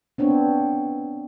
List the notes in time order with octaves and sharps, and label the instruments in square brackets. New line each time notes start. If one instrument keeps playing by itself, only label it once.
[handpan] B3 C4 D4 C#5